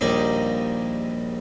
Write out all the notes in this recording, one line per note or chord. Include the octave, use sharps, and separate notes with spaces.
A#1 D#2 G3 D#4